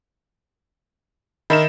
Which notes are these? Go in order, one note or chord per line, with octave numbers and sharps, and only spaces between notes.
D#3 D#4 A#4 E5 B5 E7